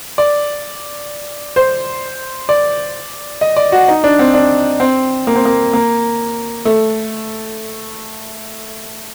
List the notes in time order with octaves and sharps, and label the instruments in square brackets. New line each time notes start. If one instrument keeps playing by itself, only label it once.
[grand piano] D5
C5
D5
D#5
D5
F#4
D#4
D4
C4
D4
C4
A#3
C4
A#3
A#3
A3